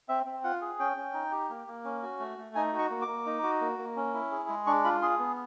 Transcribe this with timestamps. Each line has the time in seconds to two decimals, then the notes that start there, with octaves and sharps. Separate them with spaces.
0.09 C4 E5
0.26 C4
0.44 F4 F#5
0.61 G#4
0.79 C#4 G5
0.97 C#4
1.14 D#4
1.32 G4
1.49 A#3
1.67 A#3
1.85 C#4
2.02 F#4
2.20 A3
2.38 A3
2.55 D#4 G#5
2.73 F#4
2.79 C#6
2.90 A#3
3.02 D6
3.08 A#3
3.26 D#4
3.43 F#4
3.61 A#3
3.78 A#3
3.96 C#4
4.14 E4
4.32 G#4
4.49 G#3
4.67 D4 C#6
4.84 F4 B5
5.02 G#4 C6
5.19 B3